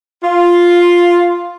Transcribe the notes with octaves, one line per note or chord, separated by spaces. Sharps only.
F4